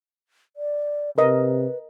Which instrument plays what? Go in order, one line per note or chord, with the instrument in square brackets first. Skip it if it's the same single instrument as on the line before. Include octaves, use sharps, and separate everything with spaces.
[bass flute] D5
[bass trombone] C3 [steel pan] A#4 D#5 [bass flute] B4